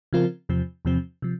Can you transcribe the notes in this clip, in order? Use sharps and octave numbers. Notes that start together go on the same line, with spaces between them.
C#3 F3 C4 F4 A#4
E2 C3 F3 C4
E2 C3 F3 C4
C3 F3